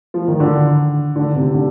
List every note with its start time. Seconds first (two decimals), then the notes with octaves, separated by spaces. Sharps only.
0.14 F3
0.28 D#3
0.40 D3
1.16 D3
1.36 C3
1.54 D3